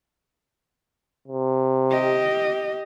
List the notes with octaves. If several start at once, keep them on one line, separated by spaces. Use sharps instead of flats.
C3
G4 D#5